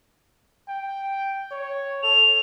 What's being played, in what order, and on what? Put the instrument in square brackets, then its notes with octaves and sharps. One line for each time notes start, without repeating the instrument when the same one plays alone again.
[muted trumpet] G5
C#5
[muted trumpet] A4 [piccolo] F7